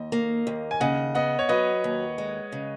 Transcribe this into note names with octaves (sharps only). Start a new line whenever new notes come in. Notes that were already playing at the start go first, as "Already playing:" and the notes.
Already playing: D#2 D#5
A#3
D#2
G#5
C#3 D#5 F#5
B3 D#5 F#5
C#5
F#3 B4 D#5
D#2
G#3
C#3